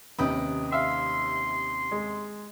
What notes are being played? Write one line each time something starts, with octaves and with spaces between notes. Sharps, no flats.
D#2 C3 C#4 B4 D#5 G5
E5 F5 C6
G#3